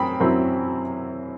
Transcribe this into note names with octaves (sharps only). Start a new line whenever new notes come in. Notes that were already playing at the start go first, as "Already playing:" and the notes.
Already playing: F#2 C4 G5 B5 D#6
F#2 F#3 C4 E4